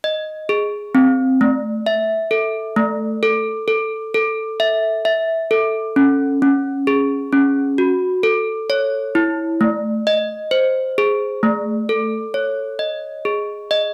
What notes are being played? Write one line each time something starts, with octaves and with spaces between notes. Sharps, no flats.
D#5
G#4
C4
A3
E5
A4
A3
A4
A4
A4
E5
E5
A4
C#4
C#4
G#4
C#4
F#4
A4
C#5
E4
A3
D#5
C5
G#4
A3
A4
C#5
D#5
G#4
D#5